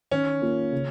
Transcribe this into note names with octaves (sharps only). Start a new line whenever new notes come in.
D#3 C#4
A#3 F4
C#3